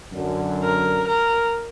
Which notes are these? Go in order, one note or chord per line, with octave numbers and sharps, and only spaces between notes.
F#2 D3
A#4
A#4